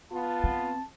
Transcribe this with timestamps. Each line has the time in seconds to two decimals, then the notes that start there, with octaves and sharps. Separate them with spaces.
0.12 B3 F4 A5
0.44 C4